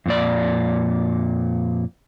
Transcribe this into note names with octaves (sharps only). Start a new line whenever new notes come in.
F2 A#2 D5